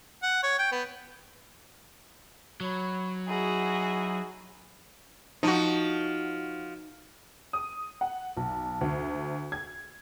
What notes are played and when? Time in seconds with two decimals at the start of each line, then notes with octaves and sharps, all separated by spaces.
0.23 F#5
0.43 C#5
0.59 G5
0.72 B3
2.60 F#3 C#5 B5
3.27 D#4 E4 F#4 G#4
5.43 F3 D#4 F#4
7.53 D#6
8.01 F#5
8.37 B1
8.81 D2
9.52 G#6